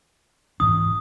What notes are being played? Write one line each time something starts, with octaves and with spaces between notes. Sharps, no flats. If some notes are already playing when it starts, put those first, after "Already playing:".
G#2 E3 D4 D#6